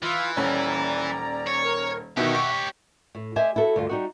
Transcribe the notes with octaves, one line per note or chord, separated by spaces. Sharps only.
E3 F4 E6 F6
D#1 C#4 D5 A#5
C#5
A#4
B2 D#3 G4 C#5 E5 F#5
C#6
A2
G4 C5 D#5 E5 G#5
E4 F#4 A4 E5
D2 G2 F4
G3 D#4 F#4